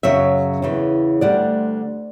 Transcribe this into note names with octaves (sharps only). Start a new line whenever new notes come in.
F#2 C#3 F#3 C#5 E5
E2 C#3 E3
D2 D3 G3 D5 F#5